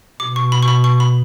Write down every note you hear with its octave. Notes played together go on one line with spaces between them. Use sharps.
B2 D6
C#6
B5
C#6
B5
C#6
B5